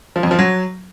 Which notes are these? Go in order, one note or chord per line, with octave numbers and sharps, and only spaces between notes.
F3
F2
F3
F#3